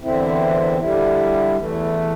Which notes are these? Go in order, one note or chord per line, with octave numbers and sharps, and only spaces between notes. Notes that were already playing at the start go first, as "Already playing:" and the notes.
E2 D3 C4 E4
D3 G3 E4
E2 E3 A3